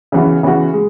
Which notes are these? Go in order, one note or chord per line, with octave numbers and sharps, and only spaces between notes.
C#3 E3 B3 F#4
C#3 E3 B3 F#4
G#3